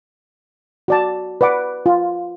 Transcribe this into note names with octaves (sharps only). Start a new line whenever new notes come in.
F#4 D5 A5
B4 D5 F#5 D6
F4